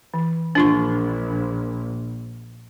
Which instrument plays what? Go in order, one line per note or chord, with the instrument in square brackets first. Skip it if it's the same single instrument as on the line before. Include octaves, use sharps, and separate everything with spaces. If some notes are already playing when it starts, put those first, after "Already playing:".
[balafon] E3
[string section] A#1 [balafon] D4 F4 C#6